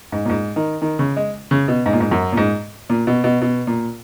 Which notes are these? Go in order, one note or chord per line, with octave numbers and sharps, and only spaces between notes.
G#2
A#2
G#2
D#3
D#3
C#3
G#3
C#3
B2
G#2
A#2
G#2
F#2
A#2
G#2
A#2
B2
B2
B2
A#2